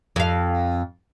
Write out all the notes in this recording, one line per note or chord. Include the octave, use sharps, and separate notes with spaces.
F2 F5